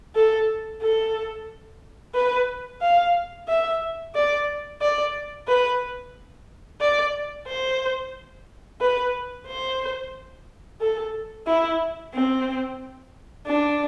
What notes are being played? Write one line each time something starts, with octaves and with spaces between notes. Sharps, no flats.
A4
A4
B4
F5
E5
D5
D5
B4
D5
C5
B4
C5
A4
E4
C4
D4